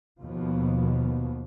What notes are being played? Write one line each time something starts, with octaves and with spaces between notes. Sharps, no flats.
D#2 B2 F3